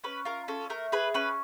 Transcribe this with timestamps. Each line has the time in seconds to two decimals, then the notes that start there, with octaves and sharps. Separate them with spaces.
0.04 C#4 B4
0.25 F4 A#4
0.48 C#4 A4
0.70 A3 A#4
0.92 G#4 B4
1.14 C#4 B4